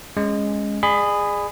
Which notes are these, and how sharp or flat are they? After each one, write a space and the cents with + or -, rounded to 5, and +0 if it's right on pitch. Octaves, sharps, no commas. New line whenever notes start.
G#3 -5 C#4 +0
G#4 -10 D5 +40 B5 +20